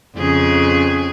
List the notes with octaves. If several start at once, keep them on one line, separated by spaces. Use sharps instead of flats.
F2 C#3 G#4